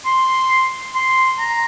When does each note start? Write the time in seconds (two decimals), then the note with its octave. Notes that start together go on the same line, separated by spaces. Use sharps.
0.06 C6
0.95 C6
1.39 A#5